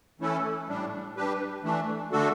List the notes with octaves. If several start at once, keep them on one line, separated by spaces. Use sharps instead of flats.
E3 A3 C#4 E4 A4
A2 G3 D4
G3 D4 G4 B4
E3 A3 D4
D3 A3 D4 F#4 A4